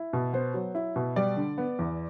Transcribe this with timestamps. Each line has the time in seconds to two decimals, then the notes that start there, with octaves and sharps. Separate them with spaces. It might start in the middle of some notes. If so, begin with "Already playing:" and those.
Already playing: E4
0.13 B2
0.33 B3 C5
0.54 F#3
0.75 E4
0.96 B2
1.16 G3 D5
1.37 D3
1.58 B3
1.79 E2